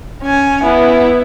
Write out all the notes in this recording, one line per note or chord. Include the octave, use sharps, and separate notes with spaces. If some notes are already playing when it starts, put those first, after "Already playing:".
C#4 G#5
B3 E4